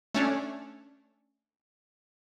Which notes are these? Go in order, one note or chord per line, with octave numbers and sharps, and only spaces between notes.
A3 C#4 D4